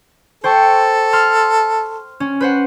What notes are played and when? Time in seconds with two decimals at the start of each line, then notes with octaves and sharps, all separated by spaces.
0.44 A4 C5 G5 C#6
1.13 C6 F6
2.20 C#4
2.40 B4 C5 F#5